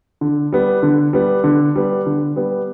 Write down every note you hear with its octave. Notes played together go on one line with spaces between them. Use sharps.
D3
G3 B3
D3
G3 B3
D3
G3 B3
D3
G3 B3